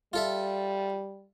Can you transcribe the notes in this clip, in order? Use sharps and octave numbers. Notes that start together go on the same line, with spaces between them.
G3 F4 A4 E5